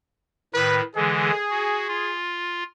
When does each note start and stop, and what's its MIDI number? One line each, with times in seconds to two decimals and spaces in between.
0.55 0.81 45
0.55 0.81 51
0.55 0.84 71
0.96 1.31 50
0.96 1.31 52
0.96 1.31 56
0.96 2.18 68
1.51 1.87 66
1.88 2.63 65